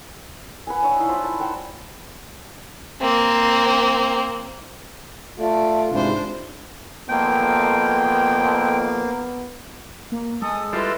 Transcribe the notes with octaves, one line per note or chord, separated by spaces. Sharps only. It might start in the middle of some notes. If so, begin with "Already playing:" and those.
B4 F#5 G#5
D4 C#5 E5 F#5
D#4 E4 F5
F4 C5 F#5 B5
F5 A5
D5 F#5 G5 E6
A#3 C4
A3 F4 D5
G#2 C3 E3 D4 C5
G#1 F2 A#3 B3 G5
A#3
G#3 A4 G#5 D#6
G3 E4 F4 A4 B4 D#5 C6